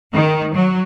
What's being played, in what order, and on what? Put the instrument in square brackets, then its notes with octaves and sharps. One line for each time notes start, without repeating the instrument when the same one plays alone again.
[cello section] D#3
F#3